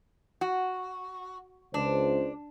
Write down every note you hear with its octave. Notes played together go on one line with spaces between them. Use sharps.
F#4
C#2 D4 C5